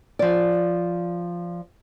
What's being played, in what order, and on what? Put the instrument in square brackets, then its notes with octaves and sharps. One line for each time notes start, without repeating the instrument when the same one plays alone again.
[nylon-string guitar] F3 D5